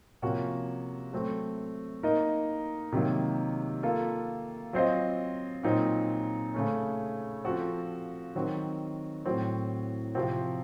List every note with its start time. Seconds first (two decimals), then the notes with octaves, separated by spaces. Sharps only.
0.22 C3 F3 A#3 C#4 F#4
1.13 F#3 A3 C4
2.03 A#3 D#4 A#4 D#5
2.92 C3 D#3 F#3 A#3
3.83 A#3 F4 A4
4.73 F#3 C4 F4 C5 D#5
5.63 A#2 F#3 C4 D#4
6.54 C#3 A3 C#4
7.45 F3 C4 F#4 A4
8.35 D#3 F#3 C4 F#4
9.25 A2 F#3 C4 F#4
10.15 C3 F3 C4 F#4